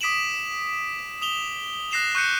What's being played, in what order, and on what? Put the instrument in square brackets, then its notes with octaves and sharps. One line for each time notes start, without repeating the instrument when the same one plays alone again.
[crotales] D6 D#6 B6 D7 E7 F#7
D#6 F7 G7
D#6 F#6 A#6 C7 E7 F7
C#6 F#6 G6 C#7 D#7